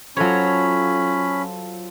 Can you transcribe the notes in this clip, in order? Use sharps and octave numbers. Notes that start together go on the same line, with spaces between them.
F#3 C#4 F4 A4 C5 C#5 B5